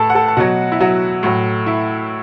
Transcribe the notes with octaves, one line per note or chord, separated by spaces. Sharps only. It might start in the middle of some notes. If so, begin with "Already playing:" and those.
Already playing: A2 A4 A5
F#5
A4 A5
A5
B2 F#3 F#4 F#5
E4
F#3 F#4
A2 F#3
E4